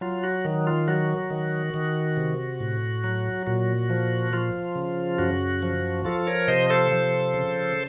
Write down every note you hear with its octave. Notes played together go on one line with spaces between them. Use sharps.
F#3 F4
F#4
D#3
F4
F#3 F#4
D#3
D#3
C3
A2
F#3
A#2 F#4
F3
F3 F4
C#3
F#2 F#4
F3
F3 F4 A4
A#4 C#5
C3 C5 D#5
A4 C5
F3
C#3